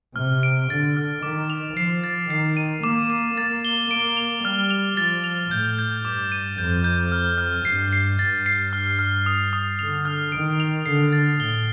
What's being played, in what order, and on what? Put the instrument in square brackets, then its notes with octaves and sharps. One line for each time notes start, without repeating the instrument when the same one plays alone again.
[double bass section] C3 [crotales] F6
[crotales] D7
[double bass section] D3 [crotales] A6
[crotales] F6
[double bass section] D#3 [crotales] D6
[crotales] F7
[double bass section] F3 [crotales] C7
[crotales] A6
[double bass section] D#3 [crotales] C7
[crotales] D#7
[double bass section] A#3 [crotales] D6
[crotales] D6
[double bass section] A#3 [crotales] A6
[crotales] G7
[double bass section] A#3 [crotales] D7
[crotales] F7
[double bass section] G3 [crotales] F6
[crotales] F7
[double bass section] F3 [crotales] A6
[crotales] F7
[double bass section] A2 [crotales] G6
[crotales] G6
[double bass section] G2 [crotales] D6
[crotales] D#7
[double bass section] F2 [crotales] G6
[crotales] G6
F6
F6
[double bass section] G2 [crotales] C7
[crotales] C7
[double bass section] G2 [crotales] A6
[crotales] C7
F6
F6
D#6
D#6
[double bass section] D3 [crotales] F7
[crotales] F6
[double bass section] D#3 [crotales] D7
[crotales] F7
[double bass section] D3 [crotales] C7
[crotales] A6
[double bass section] A2 [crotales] G7